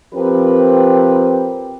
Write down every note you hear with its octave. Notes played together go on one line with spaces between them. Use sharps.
F3 C4 G4 A#4 B4